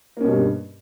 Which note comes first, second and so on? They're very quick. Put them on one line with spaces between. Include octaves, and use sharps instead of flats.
A#3 C#4 B2 G3 G2